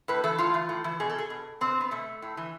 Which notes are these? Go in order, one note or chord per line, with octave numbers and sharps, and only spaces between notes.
A2 B4
E3 A4
A2 F4
E3
A2
E3
B2 G#4
A4
G#4
B2
B2 C4
B3
B2 A3
A2
E3